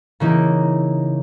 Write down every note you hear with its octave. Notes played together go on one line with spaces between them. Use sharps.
C#3 E3 A#3 D#4